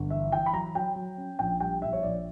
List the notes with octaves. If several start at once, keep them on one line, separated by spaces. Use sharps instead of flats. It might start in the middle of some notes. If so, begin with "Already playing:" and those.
Already playing: G1
E3 E5
E3 G5
B5
F#3 A#5
F#3 G5
F#3
C#4
A#1 G5
G3 G5
A#1 E5
C#5
A#1 D5